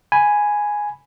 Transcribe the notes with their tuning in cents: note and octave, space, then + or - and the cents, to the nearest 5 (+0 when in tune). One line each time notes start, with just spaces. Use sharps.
G#5 +0 B5 +0